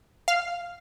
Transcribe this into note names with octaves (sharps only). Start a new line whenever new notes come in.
F5